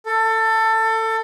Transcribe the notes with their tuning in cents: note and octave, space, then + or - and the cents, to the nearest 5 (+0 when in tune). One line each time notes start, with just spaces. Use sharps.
A4 +20